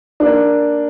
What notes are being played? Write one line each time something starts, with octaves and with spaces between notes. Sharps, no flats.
A#3 D4